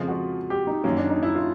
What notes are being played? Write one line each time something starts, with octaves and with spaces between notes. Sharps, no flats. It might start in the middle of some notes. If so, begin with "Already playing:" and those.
Already playing: F2 C#3 F3 G#3 F4
F#4
G4
D#4
F#2 D#3 F#3 A#3 C#4
D4
D#4
E4
F4